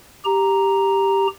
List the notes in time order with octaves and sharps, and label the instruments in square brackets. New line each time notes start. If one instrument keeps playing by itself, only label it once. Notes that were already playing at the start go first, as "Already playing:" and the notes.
[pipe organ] G4 A#5